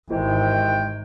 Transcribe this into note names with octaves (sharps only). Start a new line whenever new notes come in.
G#1 C3 D#3 E3 G#3 G5